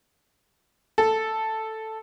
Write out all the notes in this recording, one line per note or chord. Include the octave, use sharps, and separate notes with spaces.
A4